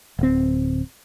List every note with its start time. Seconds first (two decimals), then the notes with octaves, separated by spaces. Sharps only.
0.19 D1 C4